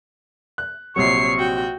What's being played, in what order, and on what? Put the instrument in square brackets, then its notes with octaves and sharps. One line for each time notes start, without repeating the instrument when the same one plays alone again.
[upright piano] F#6
[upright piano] A#1 C3 F#3 [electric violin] C#5 C7 [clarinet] C#6
[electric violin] F#4 G5